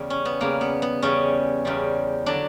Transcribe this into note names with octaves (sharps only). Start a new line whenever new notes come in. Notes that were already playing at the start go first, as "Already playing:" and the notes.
Already playing: E2 C#3 G3
C#4
B3
E2 C#3 G3 A#3
B3
B3
E2 C#3 G3 C#4
E2 C#3 G3
D3 F#3 D4